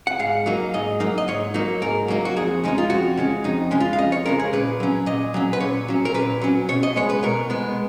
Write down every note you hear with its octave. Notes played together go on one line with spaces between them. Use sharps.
F#5
G#2 F5
F#3 A#3 D#4
G#2 D#5
F#3 A#3 D#4
D#5
G#2 C#5
F#3 A#3 D#4
G#2 A#4
F#3 A#3 D#4
F#4
F2 G#4
C#3 G#3 C#4 D#4
F4
F2 F#4
C#3 G#3 C#4
F2 D#4
C#3 G#3 C#4
F4
F5
F2 D#5
C#5
C#3 G#3 C#4 A#4
G#4
A#2 B4
F#3 C#4
A#2 D#5
F#3 C#4
B4
A#2 C#5
F#3 C#4
A#4
A#2 B4
F#3 C#4
B2 C#5
D#5
G#3 B3 C#5
B4
B2 A#4
G#3 B3